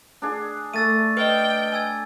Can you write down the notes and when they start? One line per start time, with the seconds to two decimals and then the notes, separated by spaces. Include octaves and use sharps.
0.22 D4 G#4
0.74 A3 E6 A6 D#7
1.17 B4 D#5 G5
1.72 G#5 E6 G#6